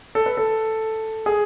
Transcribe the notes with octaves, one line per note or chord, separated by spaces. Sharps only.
A4
B4
A4
G#4